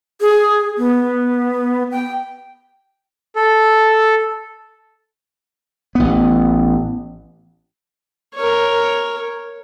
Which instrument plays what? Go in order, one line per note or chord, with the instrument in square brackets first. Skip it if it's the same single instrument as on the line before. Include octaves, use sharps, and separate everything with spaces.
[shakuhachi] G#4
B3
G5
[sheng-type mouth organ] A4
[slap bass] A1 B3
[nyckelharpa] A#4 C#5